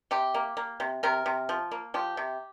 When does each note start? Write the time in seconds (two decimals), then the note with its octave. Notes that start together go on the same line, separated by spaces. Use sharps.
0.11 C3 G4
0.34 A#3
0.57 A#3
0.80 C3
1.03 C3 A#4
1.26 C3
1.49 F3
1.71 A#3
1.94 F3 G4
2.17 C3